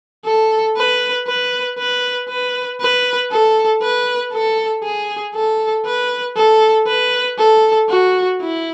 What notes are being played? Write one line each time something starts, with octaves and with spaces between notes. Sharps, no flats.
A4
B4
B4
B4
B4
B4
A4
B4
A4
G#4
A4
B4
A4
B4
A4
F#4
E4